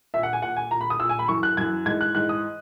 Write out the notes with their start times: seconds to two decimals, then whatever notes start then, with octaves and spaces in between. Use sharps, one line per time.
0.14 A#2 E5
0.23 F#5
0.33 G#5
0.42 A#2 F#5
0.56 G#5
0.71 A#2 A#5
0.81 B5
0.90 D#6
1.00 A#2 E6
1.09 G#5
1.19 B5
1.28 F#2 E3 C#6
1.43 F#6
1.57 F#2 E3 G#6
1.86 G#2 E3 G#6
2.01 F#6
2.15 G#2 E3 F#6
2.29 D#6